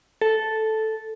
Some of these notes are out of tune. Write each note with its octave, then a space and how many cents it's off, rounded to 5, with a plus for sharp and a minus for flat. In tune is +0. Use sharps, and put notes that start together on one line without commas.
A4 -5